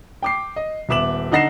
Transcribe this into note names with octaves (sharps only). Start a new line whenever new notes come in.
G5 D6 C7
D#5
D#1 B3 E5 D6 E7 F#7
D3 D#4 F#5 A#6 C7 E7